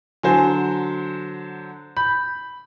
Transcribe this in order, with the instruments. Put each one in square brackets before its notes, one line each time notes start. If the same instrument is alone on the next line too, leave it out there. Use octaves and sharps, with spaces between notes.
[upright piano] D3 F#3 C5 [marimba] G#5
[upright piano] B5 [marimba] G6